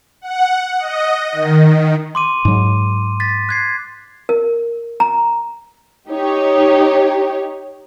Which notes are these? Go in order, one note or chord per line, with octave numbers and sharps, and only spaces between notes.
F#5
D#5
D#3
C6 D6 D#7
G#2 F#3
A6 B6
F#6 G#6 C7
A#4
A#5
D#4 G4 C#5